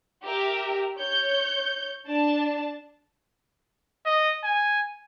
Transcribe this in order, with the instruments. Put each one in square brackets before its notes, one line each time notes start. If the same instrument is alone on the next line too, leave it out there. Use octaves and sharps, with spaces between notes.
[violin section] G4 A#4 E5
C#5 G6
D4 A5
[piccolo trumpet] D#5
G#5